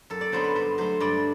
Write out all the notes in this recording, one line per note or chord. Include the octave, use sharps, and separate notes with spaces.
F#2 A4
D5
D3 F#3 B3 C5
B4
G2 C5
F#3 A3 C5
G2 D5